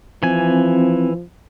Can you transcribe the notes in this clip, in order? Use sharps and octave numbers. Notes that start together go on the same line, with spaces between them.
E3 F3 C4 G#5